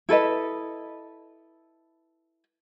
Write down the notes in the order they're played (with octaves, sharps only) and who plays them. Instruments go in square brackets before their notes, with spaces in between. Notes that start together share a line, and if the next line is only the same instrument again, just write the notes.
[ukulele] E4 A4 B4 D#5